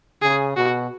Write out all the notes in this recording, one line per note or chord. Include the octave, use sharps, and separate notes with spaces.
C#3 G#4
B2 F#4